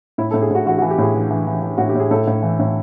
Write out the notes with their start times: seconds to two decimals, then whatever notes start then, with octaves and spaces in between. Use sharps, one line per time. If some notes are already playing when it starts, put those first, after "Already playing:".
0.18 A2 E4
0.31 A4
0.34 A2
0.42 G#4
0.50 A2 F#4
0.66 E3 F#4
0.78 F#4
0.82 E3
0.90 G4
0.98 A2 G#4
1.15 E3
1.31 E3
1.47 E3
1.62 E3
1.77 A2 F#4
1.89 G4
1.95 A2 G#4
2.11 A2 A4
2.27 A2
2.42 E3
2.59 A2